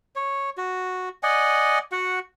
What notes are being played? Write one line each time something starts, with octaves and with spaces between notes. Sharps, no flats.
C#5
F#4
D5 D#5 F#5 G#5
F#4 F#5